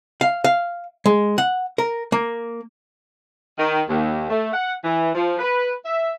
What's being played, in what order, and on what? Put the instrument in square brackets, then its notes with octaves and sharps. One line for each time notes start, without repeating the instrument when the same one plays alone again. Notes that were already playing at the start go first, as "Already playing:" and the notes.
[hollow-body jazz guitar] F5
F5
G#3
F#5
A#4
A#3
[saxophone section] D#3
D#2
A3
F#5
E3
F3
B4
E5